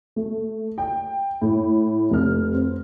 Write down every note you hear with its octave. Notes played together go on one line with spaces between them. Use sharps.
A3
G5
A2
F1 C3 F6
C4